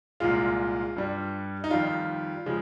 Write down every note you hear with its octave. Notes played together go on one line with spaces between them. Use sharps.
C2 A#2 G#3 F4
G2 G3
D#4
F2 D#3 G3 F4
C#3 F3 G#3